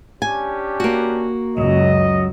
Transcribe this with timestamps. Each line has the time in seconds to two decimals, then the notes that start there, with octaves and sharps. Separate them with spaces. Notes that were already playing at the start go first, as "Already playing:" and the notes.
0.22 C#4 D4 G4 G#5
0.80 A#3 F#4
1.58 C#2 F#2 F#3 D#5